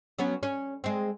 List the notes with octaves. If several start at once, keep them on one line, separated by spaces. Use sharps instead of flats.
F#3 B3 C#4
C#4
G#3 C4